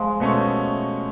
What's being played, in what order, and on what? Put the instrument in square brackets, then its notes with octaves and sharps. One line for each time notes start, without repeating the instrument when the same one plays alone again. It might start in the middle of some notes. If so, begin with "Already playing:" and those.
Already playing: [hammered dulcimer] F3 G#3
[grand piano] B2 A3 C#4